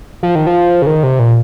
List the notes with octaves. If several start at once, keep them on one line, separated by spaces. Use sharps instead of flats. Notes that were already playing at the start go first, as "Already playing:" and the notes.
F3
D#3
F3
C#3
D#3
C3
A#2